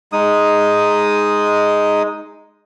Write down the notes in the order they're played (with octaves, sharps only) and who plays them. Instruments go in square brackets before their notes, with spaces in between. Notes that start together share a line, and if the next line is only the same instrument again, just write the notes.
[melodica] G#3 D#4 D#6